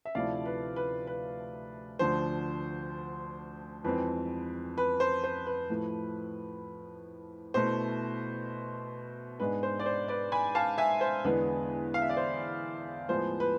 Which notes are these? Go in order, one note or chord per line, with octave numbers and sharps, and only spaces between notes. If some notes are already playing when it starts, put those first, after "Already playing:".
E5
D2 C3 F3 A3 E4 D5 F5
B4
B4
B4
D2 D3 F3 C5
F2 E3 G#3 C4 B4
B4
C5
C5
B4
A2 F3 A3
B2 A3 E4 C5
G#2 G#3 B3 D4 B4
C5
D5
C5
B4 D5
G#5 B5
F5 A5
E5 G#5
C5
E2 D3 G#3 B3 B4
F5
E5
D5
C5
A2 F3 G#3 B3 C5
B4